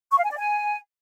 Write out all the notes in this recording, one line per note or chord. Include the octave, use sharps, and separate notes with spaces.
C#6
F5
G#5
D5
G#5